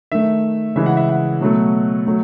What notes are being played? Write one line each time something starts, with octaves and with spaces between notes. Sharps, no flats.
D#3 A3 E5
C#3 E3 G#3 E5
F#5
E5
F#5
B2 F#3 A3
F#3 A3